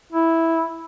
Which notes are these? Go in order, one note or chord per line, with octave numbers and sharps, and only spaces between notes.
E4